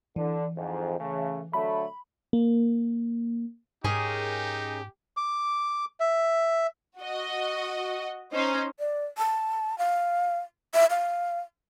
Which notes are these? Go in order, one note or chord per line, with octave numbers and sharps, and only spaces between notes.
D3 E3
F2 G#2
C#3 A3
D3 F#3 A3 B5
A#3
G#2 C#4 D#4 G4 G#4 A#4
D6
E5
F#4 D#5
C#4 D#4 C5
D5
A5
F5
E5
F5